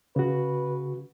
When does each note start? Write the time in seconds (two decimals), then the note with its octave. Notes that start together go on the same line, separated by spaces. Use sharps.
0.16 C#3 F#4 B4